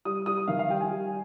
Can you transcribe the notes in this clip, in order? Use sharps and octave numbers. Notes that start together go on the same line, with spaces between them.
G3 D#6
G3 D#6
D#6
D#3 F5
F5
G3 G5
G#5
G3